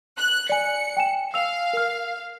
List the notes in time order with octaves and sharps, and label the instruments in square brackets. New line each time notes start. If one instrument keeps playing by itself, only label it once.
[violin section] F#6
[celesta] D5 G#5 [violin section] C#7
[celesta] G5 G#5 E7
[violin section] F5 [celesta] E6 F7
[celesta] A#4 F6